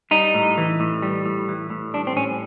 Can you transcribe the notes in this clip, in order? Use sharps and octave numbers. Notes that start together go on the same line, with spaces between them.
G3 D#4
A2
E3
A2
G3
A2
E3
A2
G3 D4
C4
A2 C#4